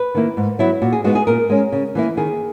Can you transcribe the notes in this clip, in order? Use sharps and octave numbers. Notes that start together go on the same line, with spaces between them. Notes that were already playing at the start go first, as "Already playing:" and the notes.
Already playing: B4
D#3 A#3 E4
G#2
F#3 B3 E4
A#2 F#4
G#4
G#3 B3 D#4 F#4
G#4
A#2 A#4
G#3 C#4
C#3
E3 A#3 E4
D#3 G#4